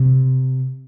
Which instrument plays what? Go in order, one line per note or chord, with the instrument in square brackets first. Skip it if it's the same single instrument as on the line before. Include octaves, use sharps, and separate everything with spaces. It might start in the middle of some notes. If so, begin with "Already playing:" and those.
Already playing: [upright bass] C3